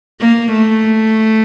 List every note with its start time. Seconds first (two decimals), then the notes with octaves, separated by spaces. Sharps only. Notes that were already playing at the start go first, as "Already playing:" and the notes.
0.20 A#3
0.52 A3